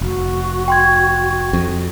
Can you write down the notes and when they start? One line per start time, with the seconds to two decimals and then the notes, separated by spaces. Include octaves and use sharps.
0.01 F1 F#4
0.68 G5 C6 G#6
1.53 F2